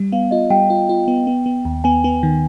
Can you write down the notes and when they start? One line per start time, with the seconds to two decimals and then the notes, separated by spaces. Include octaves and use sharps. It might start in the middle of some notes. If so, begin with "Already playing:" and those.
Already playing: G3
0.12 B3 F5
0.31 F4 D#5
0.50 G3 G5
0.70 F4
0.89 F4
1.08 B3
1.27 B3
1.46 B3
1.65 D#2
1.84 B3 G#5
2.04 B3
2.23 D#3